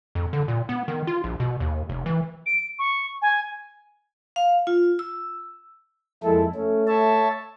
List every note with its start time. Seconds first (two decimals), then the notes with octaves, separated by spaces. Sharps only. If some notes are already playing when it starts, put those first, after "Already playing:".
0.15 F2
0.33 D3
0.48 A#2
0.69 B3
0.88 D#3
1.07 F4
1.24 A#1
1.40 B2
1.60 D#2
1.89 F1
2.06 E3
2.46 D7
2.79 C#6
3.22 G#5
4.36 F5
4.67 F4
4.99 E6
6.24 F2 G#3 A#3 E4 A4
6.56 A3 C#4
6.88 C#5 E5 A5